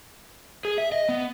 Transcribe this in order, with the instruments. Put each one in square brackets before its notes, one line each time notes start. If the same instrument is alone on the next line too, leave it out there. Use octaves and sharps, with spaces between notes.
[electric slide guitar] G#4
E5
D#5
B3